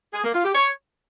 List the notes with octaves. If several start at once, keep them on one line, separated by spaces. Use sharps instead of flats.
G#4
A#3
F4
G4
C#5